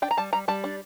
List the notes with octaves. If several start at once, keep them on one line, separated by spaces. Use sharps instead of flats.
D4 G5
A#5
G3 A5
G3 A#5
G3 A5
D4